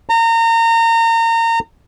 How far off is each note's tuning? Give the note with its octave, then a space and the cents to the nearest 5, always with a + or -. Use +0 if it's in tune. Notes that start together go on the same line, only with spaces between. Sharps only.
A#5 -30